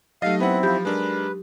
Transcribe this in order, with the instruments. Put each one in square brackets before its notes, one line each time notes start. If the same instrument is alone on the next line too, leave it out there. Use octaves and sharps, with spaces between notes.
[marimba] F#3 D#4 G4 [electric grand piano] A3 D#5 [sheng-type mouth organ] F5
[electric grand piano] B3 F#5 [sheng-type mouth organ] C4 E4
[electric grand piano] F3 [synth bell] G4 [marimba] F5 B5 G6
[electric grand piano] G#3 D4 A#4 [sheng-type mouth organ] B4